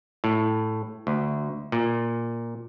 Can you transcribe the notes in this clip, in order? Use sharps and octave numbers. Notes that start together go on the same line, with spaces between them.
A2
D2
A#2